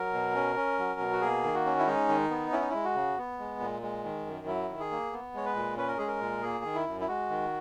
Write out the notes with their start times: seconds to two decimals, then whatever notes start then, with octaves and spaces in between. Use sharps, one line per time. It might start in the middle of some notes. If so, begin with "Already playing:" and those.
Already playing: F#3 A#4
0.13 B2
0.35 C#4
0.56 C#4
0.79 F#3
1.00 B2
1.12 F#4
1.21 A#3 G#4
1.43 D#3
1.54 F#4
1.66 C#4
1.79 E4
1.86 G#3 D#4
2.09 D#3
2.30 B3
2.52 C#4 E4
2.61 D#4
2.70 G#3 E4
2.84 F#4
2.95 C#3
3.18 B3
3.39 G#3
3.60 A#2
3.82 G#3
4.04 D#3
4.26 F#2
4.47 F#3 E4
4.69 D#3
4.80 G#4
4.91 A#3
5.13 B3
5.34 G#3 C#5
5.45 B4
5.55 A#2
5.77 C#4 B4
5.88 A#4
5.98 G#3 G#4
6.07 A#4
6.20 A#2
6.42 A#3 G#4
6.64 D#3
6.75 E4
6.86 F#2
7.01 E4
7.08 G#3 F#4
7.30 D#3